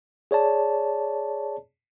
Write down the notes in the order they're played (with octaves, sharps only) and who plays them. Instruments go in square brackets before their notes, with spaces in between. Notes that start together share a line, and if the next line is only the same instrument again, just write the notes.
[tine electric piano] G#4 C#5 D5 A5